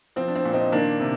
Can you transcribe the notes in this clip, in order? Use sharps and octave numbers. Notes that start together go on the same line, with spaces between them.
F3 C4
D4
C4
A#2
C4 D#4
D#3 A#3 D4
C3